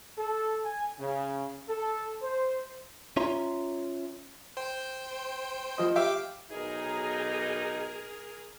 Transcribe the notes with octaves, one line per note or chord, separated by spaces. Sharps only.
A4
G#5
C#3
A4
C5
C#4 F4 C#5 E5 A#5 C6
C5 G5
F3 D#5
G4 E5 F5 G5 D6
B1 D#4 G#4 A#4